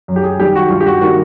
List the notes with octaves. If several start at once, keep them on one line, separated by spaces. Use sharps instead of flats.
F#2
G4
G#4
D#3 G3 G4
F#4
G2 F4
G4
F#4
D#3 G3 A#3 F#4